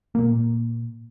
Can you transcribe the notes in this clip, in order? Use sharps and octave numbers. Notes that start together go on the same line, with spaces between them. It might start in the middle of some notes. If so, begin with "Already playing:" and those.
A#2 A#3